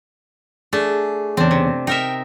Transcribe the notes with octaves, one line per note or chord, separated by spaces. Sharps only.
A3 D4 G#4
E2 C#3 C4 D4
C3
D#4 A#4 E5 G5